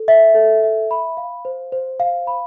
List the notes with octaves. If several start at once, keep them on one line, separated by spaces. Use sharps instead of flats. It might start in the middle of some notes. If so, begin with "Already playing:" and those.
Already playing: A4
E5
A4
E5
B5
F5
C5
C5
F5
B5